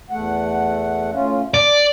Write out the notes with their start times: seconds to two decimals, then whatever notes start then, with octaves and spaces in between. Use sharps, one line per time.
0.10 E2 A3 F#5
1.12 A2 C#4 F4
1.54 D5 A5